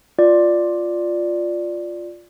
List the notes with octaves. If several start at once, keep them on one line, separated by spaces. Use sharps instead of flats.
F4 D5